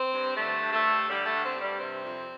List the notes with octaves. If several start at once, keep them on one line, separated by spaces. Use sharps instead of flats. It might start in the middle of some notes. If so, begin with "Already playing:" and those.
Already playing: C4
G2
D3 A3
G2
A3
G2
D3 G3
A3
G2
C4
G2
G3
C3 C4
F2